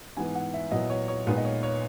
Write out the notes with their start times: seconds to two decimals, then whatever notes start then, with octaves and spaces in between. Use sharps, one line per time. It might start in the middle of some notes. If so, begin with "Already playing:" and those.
0.17 G#2 E3 B3 G#5
0.35 F#5
0.54 E5
0.71 A#2 F#3 B3 E4 D#5
0.90 C#5
1.08 C#5
1.27 A#2 G#3 B3 D#4 B4
1.37 D#5
1.45 C#5
1.63 C#5